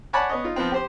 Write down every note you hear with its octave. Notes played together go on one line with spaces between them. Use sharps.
C#5 D5 F#5 G#5 A5 B5
B3 C#5 D#5
D#4 F4
F3 B3 C4
G4 C5 C6